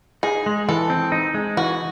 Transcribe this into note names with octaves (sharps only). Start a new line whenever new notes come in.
D#4 G#4
G#3
E3 A4
C4
D#4
G#3
E3 F#4